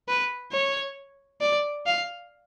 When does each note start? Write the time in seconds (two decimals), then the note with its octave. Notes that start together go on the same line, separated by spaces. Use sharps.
0.08 B4
0.52 C#5
1.41 D5
1.86 F5